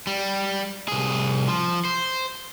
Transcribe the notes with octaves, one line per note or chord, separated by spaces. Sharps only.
G3
C2 G#4
F3
C5